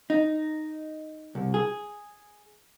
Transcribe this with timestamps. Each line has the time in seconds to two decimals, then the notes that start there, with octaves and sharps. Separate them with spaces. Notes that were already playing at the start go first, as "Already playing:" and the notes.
0.10 D#4
1.35 C2
1.54 G#4